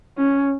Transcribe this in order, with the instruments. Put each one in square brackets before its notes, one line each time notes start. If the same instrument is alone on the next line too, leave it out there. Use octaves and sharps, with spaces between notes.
[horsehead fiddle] C#4